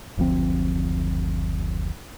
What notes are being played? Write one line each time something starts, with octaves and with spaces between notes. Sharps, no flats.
F#1 D2 F3 C4